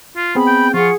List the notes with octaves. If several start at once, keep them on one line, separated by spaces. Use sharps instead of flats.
F4
B3 C4 G#4 B5
G5
F3 F4 G#4 F#5 C#6